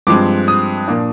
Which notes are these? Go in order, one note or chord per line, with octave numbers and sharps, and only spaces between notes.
G2 F3 G#3 C4 D6
D#6
A#2 F3 A#3 D4